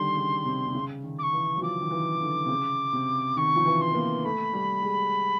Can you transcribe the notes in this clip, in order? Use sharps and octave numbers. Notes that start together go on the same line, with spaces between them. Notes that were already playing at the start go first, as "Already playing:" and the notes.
Already playing: D3 D#3 G3 C6
C#3
C3
C3
C#3
D#3
D6
C#6
E3
F#3
F3 D6
D#3
E3
D3
C3
C#3
C3
D#3 C#6
F3
E3
C6
B3
A#3
A3 B5
G3
G#3